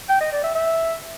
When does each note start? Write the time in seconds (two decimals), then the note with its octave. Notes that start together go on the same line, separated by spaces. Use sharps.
0.09 G5
0.20 D#5
0.32 D5
0.43 E5
0.55 E5